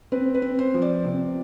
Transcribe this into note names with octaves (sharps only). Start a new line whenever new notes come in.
C4 B4
B4
C4
C5
F3
D5
C3